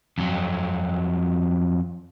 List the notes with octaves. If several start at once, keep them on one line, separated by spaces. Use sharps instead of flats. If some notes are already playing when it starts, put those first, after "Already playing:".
F2 F#3